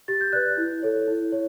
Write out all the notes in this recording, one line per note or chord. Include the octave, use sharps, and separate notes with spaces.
G4 A6
G6
B4 D5 F#6
E4
A4 C#5
E4
C#5